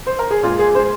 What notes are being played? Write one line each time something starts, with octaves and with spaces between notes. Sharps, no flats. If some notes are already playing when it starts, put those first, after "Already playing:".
C5
A#4
G#4
A#2 G#3 F4
G#4
G#3 C5